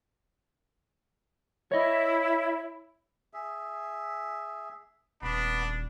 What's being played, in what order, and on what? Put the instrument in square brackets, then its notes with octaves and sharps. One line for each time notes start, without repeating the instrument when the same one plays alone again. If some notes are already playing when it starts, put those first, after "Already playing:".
[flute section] E4 [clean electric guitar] C#5 D#5
[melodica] G#4 E5
[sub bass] D#1 [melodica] B3 B5 [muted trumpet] D4